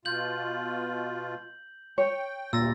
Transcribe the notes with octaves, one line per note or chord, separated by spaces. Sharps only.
B2 F4 G6 F#7
C#5 G5
D2 G2 A#2 E6 A6 A#6